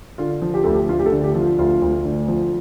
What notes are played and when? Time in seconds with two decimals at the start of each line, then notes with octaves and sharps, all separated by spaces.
0.18 D3 F4
0.42 F3
0.54 G4
0.64 D2 A4
0.73 G4
0.88 D2 F4
0.99 G4
1.06 A4
1.12 D3
1.24 G4
1.35 F3
1.41 F4
1.59 D2 F4
1.82 D2
2.05 D3
2.28 F3